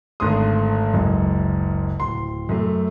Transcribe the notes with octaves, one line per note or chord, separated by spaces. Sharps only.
G#1 D3 A3 C6 D#6
F#1 C#2 F#2
D1 C6
F#2 A3